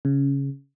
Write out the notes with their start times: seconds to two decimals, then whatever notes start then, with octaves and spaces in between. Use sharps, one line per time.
0.05 C#3